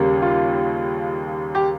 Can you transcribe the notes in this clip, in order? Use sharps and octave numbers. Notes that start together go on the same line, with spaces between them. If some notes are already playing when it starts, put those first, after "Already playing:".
Already playing: D#2 C#3 G3 A#3
F4
G4